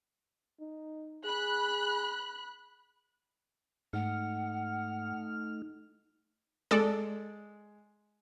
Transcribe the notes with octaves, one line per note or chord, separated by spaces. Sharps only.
D#4
G#4 B5 F#6
G#2 A3 D#4 F#5 F6
G#3 A4 D5